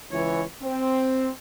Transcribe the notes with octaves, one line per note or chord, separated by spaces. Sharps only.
C#2 E3 C#5
C4